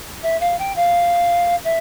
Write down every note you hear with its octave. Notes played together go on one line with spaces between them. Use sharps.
E5
F5
G5
F5
E5